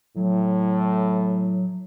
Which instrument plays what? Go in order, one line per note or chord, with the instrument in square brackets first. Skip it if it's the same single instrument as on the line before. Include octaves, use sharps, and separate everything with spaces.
[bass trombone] A2 [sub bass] F#3